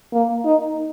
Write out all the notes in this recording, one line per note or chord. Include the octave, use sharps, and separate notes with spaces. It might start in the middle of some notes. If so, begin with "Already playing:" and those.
A#3
D#4